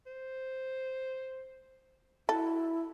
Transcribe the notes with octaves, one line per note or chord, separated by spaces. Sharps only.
C5
E4 F#4 A4